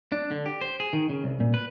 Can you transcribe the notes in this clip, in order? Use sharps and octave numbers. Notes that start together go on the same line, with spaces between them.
D4
D3
G4
C5
G#4
D#3
C#3
C2
A#2
B4